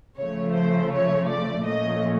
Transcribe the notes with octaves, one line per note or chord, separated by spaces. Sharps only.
C#3 F3 A3 C#5
C5
C#5
D5
A#2 F3 A3 C#4 D#5